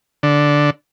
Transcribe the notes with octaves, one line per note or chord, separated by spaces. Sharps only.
D3